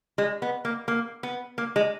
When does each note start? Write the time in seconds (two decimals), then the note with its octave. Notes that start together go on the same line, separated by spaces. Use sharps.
0.18 G#3
0.42 B3
0.65 A#3
0.88 A#3
1.23 B3
1.58 A#3
1.76 G#3